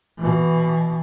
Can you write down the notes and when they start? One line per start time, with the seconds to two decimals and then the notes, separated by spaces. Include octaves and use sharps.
0.18 B2 E3